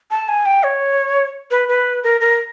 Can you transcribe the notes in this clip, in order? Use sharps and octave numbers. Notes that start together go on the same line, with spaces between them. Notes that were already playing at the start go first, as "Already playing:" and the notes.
A5
G#5
G5
C#5
B4
B4
A#4
A#4